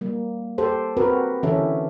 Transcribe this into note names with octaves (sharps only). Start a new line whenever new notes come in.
G3 A#3
G4 A4 C5
C4 F#4 G4 A#4 B4
D3 E3 C#4 G4 A4 E5